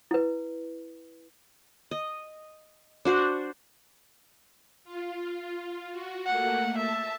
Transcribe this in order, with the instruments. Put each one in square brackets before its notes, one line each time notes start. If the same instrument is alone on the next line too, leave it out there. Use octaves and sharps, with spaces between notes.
[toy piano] E4 B4
[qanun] D#5
D4 F#4 C5
[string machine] F4
F#4
[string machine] A3 A#3 [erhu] F#5
[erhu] E5 [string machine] A5